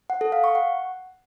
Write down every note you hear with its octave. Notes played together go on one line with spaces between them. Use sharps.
F#5
A4
F5
C#6
F#5